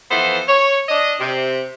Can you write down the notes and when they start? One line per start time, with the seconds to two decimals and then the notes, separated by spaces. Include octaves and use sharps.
0.11 E3 F3 B3 A4 C5
0.49 C#5
0.89 D4 D#5
1.21 C3